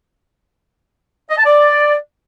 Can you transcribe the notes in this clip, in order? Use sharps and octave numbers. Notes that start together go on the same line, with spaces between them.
D#5
A5
D5